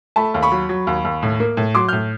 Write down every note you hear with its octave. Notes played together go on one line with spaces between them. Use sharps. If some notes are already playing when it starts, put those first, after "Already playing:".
A3 A5 B5
D#2
B5 C#6
F#3
F#3
D#2
D#2
A2
A#3
A2
F#3 C6 D6
A2 F6 G6